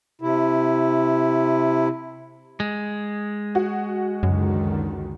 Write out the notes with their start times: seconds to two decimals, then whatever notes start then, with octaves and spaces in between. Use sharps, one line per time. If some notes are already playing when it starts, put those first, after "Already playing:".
0.22 C3 E4
2.60 G#3
3.55 F#4
4.23 C#2 F#2 D3 D#3